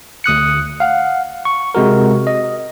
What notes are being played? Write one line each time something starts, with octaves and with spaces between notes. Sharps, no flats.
D2 D#6 F#6 C#7
F5 F#5
C#6
C3 G#3 F#4 A#4
D#5